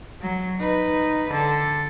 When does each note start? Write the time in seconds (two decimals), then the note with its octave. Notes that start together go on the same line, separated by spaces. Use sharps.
0.22 F#3
0.60 D#4 B4
1.31 D3 A4